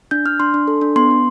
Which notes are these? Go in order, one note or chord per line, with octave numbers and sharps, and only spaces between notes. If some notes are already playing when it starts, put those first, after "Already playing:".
D4 G6
D4 F6
D4 C6
D4
A4
D4
B3 C6
B3